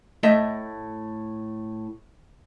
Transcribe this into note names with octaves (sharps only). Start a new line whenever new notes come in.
A2 A3 D#5 E5